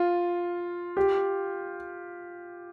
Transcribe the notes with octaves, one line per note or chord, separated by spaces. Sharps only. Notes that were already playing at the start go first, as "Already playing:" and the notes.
Already playing: F4
G4